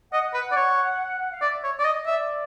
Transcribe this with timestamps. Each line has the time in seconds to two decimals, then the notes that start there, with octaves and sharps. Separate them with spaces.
0.13 D#5 F#5
0.34 B4
0.51 D5
0.56 C#5
1.32 F5
1.41 D5 E5
1.64 C#5
1.79 D5
1.85 D#5
2.06 D5 E5